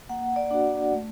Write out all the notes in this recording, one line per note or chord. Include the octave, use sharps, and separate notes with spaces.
A#3 F#5
D5
D4 F#4
A3